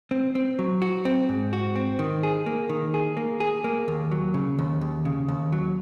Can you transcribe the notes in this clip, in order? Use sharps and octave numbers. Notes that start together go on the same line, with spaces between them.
C4
C4
F#3
F#4
C4
G#2
F#4
C4
D#3
G#4
A#3
D#3
G#4
A#3
G#4
A#3
D#2
F#3
C#3
D#2
D#2
C#3
D#2
F#3